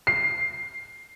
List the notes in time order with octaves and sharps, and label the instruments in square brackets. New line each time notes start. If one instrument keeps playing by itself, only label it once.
[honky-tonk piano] C7